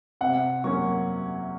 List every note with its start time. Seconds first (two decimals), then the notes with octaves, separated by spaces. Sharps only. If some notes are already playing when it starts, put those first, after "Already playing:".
0.21 C3 F#5
0.64 F#3 A#3 C#4 C#6